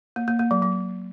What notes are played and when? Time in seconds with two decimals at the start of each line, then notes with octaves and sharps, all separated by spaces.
0.16 A#3
0.28 A#3
0.39 A#3
0.51 F#3
0.62 F#3